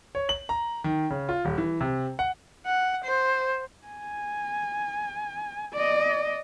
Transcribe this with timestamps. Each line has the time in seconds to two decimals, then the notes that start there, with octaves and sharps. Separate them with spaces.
0.15 C#5
0.29 F#7
0.49 A#5
0.84 D#3
1.10 C#3
1.29 F4
1.45 D#1
1.58 E3
1.81 C3
2.19 F#5
2.66 F#5
3.04 C5
3.86 G#5
5.74 D5 D#5